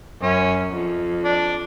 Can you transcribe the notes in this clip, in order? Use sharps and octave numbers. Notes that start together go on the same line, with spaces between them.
F#2 C#4
F2
D4